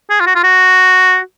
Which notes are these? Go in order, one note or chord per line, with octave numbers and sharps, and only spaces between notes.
G#4
F4
F#4
F4
F#4